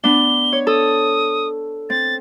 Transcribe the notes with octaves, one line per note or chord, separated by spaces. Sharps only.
B3 D4 G7
C#5
A4 D#6
C4 A6